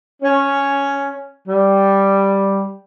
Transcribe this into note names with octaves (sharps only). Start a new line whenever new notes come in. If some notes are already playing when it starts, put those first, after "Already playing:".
C#4
G3